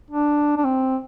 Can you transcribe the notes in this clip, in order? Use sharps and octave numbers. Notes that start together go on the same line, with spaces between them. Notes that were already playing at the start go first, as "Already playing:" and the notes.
D4
D4
C4